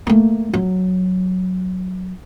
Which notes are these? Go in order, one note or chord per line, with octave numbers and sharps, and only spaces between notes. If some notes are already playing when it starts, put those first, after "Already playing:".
A3 A#3
F#3